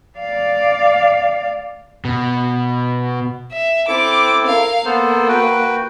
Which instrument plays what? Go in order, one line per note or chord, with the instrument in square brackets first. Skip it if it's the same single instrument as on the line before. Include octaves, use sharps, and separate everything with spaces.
[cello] D5 F5
[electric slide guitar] B2
[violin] E5
[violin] C4 D6 [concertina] E4 A4
[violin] A#4 F5
[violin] A#3 [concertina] B3 A4 C5
[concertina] F#4 B4 G5